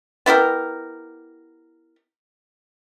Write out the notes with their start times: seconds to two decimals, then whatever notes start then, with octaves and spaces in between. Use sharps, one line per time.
0.26 B3 E4 G4 A#4